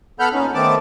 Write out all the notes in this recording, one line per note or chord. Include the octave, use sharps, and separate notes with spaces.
B3 A4 F#5 B5 F6 G6
A#2 C#4 D#4
D#3 A3 B3 C4 A5 D6